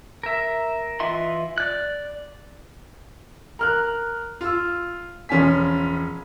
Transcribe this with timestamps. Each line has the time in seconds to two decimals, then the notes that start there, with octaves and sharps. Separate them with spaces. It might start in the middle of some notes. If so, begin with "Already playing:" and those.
0.23 A#4 E5
1.00 E3 F4 D#5 E5 C6
1.58 D5 F#6
3.59 A#4 F6 F#6
4.41 F4 E6
5.29 E1 F3 C#4 F4 G#5 B6